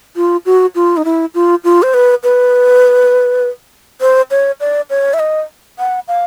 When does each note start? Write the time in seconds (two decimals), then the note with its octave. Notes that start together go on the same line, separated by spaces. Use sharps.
0.16 F4
0.46 F#4
0.75 F4
0.97 D#4
1.05 E4
1.34 F4
1.64 F4
1.83 C5
1.94 B4
2.23 B4
4.01 C5
4.31 C#5
4.60 D5
4.90 C#5
5.14 E5
5.19 D#5
5.79 F#5
6.08 F5